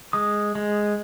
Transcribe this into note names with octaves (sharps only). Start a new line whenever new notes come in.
G#3 D#6
G#3